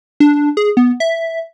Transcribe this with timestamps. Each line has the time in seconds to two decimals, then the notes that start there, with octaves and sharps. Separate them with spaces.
0.20 D4
0.57 G#4
0.77 B3
1.00 E5